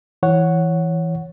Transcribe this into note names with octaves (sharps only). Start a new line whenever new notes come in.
E3 C#5 F#5